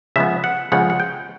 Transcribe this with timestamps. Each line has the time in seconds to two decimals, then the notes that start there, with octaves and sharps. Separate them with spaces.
0.16 C#3 F3 G#3 B3 E5
0.44 F#5
0.72 C#3 F3 G#3 B3 F#5
0.90 F#5
1.00 G5